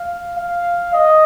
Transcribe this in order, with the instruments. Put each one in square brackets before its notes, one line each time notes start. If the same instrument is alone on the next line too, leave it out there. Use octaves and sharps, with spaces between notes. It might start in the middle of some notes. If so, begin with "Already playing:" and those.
Already playing: [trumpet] F5
F5
D#5